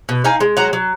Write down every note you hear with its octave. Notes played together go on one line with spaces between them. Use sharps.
B2
D#4 F5 G#5
G#3
F#3 F#5 A#5
F#3